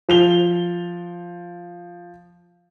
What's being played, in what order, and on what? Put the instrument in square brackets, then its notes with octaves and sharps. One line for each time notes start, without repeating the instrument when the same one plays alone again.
[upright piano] F3 F7 G7